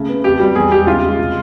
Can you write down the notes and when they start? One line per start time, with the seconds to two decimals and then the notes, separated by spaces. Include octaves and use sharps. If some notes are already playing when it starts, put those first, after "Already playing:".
Already playing: C#3 A3
0.09 B3
0.24 F2 G4
0.40 G3
0.55 E2 G#4
0.71 G#3 G4
0.87 C#3 F4
1.03 G#3
1.19 C3